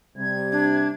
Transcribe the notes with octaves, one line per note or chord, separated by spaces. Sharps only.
C3 G3 G#6
D4